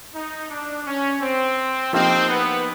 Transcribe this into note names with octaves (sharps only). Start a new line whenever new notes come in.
D#4
D4
C#4
C4
F3 A#3 C4 D#4 G4
B3